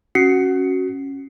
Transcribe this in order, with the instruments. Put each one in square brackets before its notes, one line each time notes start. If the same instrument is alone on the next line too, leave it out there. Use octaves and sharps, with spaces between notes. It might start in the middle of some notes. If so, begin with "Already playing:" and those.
[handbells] C#4 C7 C#7 [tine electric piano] F#4